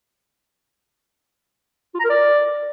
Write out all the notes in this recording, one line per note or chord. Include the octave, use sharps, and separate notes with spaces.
F4
A#5
A#4
D5